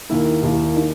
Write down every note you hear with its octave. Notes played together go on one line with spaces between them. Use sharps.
D#2 D#3 A#3 E4
D#2 D#3 A#3 E4
D#3 A#3 D#4